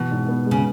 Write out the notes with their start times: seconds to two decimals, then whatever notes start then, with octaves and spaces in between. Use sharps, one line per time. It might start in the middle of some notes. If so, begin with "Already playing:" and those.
Already playing: B2 E3
0.11 G#2
0.28 B3
0.46 G#3
0.51 C#3